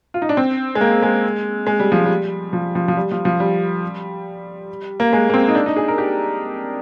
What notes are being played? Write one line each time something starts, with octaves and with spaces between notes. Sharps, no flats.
F4
D#4
D4
C4
G#3
A#3
G#3
G#3
G3
F3
G3
F3
F3
F3
G3
F3
F3
G3
A#3
G#3
A#3
C4
D#4
D4
D#4
G#4
A#4
G4